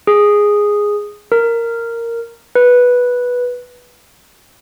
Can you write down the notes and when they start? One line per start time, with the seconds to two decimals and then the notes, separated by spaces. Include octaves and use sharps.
0.07 G#4
1.32 A#4
2.55 B4